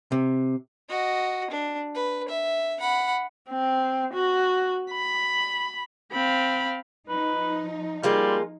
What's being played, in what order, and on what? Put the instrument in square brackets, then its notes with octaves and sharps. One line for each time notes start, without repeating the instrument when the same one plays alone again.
[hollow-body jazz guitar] C3
[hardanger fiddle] F#4 D#5
D4
B4
E5
F#5 B5
[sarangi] C4
F#4
B5
[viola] C4 F5 [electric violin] B5
[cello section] F3 D#4 [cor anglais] B4
[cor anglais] G3 [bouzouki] G#3 A#3 F4